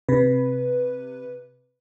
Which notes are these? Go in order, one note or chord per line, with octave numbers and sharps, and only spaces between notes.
C3 B4